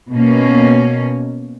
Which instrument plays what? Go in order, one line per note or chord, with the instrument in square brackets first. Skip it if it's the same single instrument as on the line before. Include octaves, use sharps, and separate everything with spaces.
[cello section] B2 A#3 C#4